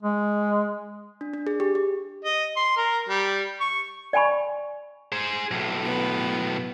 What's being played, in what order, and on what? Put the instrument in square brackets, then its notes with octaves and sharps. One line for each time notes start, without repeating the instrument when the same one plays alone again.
[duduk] G#3
[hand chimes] D4
D4
G#4
G4
G4
[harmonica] D#5
C6
A#4
G3
C#6
[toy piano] D5 G5 G#5 B5 C#6
[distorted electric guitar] G#4 C5
B1 A2
[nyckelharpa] B3